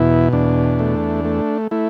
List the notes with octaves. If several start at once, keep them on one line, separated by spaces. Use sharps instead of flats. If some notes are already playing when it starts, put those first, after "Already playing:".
Already playing: E2 B2 E4
E2 D4
A3
A3
A3 E4